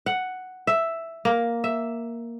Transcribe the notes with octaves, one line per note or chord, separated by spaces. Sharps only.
F#5
E5
A#3
E5